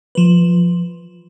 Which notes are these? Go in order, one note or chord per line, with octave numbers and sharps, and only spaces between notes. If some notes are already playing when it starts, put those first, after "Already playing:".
F3 B4